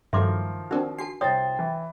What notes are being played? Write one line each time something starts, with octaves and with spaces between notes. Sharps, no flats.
G2 D#3 F3 F#3 A3 E5 C6 D6
C4 D4 D#4 F#4 A#4
D4 F#4 A5 C7
C2 E4 C5 C#5 G5 D#6 A6
E3